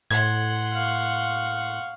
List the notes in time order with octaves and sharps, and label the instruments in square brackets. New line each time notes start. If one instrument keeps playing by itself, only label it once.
[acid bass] A2 [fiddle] F#5 C6 [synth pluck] G#6
[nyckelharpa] F5 C#6